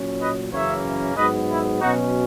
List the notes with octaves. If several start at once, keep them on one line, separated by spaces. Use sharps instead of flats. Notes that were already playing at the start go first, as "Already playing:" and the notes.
Already playing: A#2 F#3 C#4
B4 D#5
F#2 C#3 E3 A#3 C#4 C#5 E5
G#2 F#3 B3 B4 D#5
E4
B2 F#3 C#4 D#4 F#4